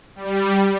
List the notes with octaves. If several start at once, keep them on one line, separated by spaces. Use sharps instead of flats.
G3